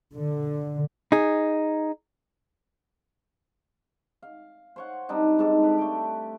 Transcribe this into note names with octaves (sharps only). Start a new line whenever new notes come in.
D3
D#4 G#4
F5
C5 C#5 F#5
G3 C4 D4 D#4
G#2 D#4 A4 A5
G4 B4 D5
A3 G5